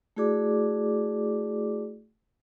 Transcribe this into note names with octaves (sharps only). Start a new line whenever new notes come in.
A3 E4 F#4 G#4 D5 D6